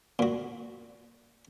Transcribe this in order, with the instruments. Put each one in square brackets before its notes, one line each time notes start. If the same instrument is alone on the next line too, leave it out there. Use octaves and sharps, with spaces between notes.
[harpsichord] A#2 F#4